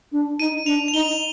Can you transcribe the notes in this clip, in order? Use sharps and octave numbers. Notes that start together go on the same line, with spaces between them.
D4
D#4 D#7
D4 F7
F7
D#4 G7